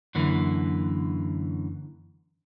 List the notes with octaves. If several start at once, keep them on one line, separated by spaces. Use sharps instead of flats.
F#2 D3 E3 A#3